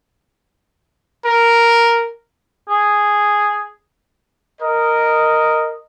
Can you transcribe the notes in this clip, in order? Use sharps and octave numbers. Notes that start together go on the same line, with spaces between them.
A#4
G#4
A#4 D#5